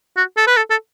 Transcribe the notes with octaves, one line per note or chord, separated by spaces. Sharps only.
F#4
A4
B4
A4
A4